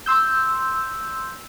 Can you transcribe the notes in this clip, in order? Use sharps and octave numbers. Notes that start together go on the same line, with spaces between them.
C6 E6 G6